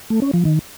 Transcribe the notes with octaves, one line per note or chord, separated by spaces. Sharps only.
A3
C#4
F3
D#3